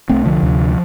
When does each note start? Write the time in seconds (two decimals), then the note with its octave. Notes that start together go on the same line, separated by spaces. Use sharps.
0.09 C2 C3 A3 C4
0.25 D3 F3
0.43 D2 C3